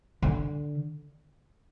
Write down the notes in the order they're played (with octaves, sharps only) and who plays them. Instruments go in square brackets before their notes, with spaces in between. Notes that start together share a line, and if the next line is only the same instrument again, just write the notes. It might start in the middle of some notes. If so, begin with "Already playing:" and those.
[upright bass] D3